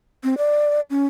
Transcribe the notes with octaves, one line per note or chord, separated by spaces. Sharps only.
C4
D5
C#4